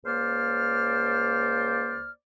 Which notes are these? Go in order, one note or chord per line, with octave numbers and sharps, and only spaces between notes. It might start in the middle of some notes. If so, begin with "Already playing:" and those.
C#2 A#3 C5 D5 F6